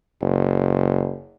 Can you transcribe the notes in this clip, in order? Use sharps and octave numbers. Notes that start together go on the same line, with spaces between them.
F#1